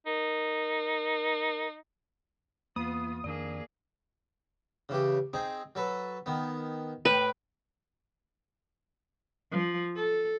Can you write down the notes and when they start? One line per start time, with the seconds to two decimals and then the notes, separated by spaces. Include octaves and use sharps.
0.06 D#4 A#4
2.76 E2 A#3 B3 F4 D#6
3.24 F2 D#3 A#3 D4 G#4 D5
4.89 C#3 E3 G4
5.33 C4 D#4 G#4
5.75 F#3 A4 B4
6.26 D#3 B3
7.05 A2 B4 G5
9.51 F3
9.96 A4